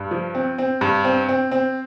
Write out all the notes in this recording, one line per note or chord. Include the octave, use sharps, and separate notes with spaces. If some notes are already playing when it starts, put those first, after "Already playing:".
Already playing: G2
F3
C4
C4
G2
C4
C4
C4